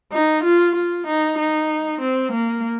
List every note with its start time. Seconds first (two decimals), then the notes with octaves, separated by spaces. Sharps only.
0.12 D#4
0.43 F4
0.75 F4
1.07 D#4
1.38 D#4
2.01 C4
2.32 A#3